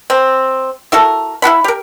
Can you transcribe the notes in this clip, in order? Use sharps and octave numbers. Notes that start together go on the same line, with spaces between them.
C4
E4 F#4 A4 A#4
E4 F#4 F#5 B5
G4 A#4